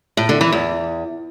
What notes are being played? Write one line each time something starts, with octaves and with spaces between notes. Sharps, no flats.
A2
D3
E3
E2